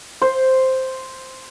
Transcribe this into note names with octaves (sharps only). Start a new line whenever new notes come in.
C5